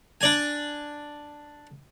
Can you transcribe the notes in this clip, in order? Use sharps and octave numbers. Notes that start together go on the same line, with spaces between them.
D4 D5 G#5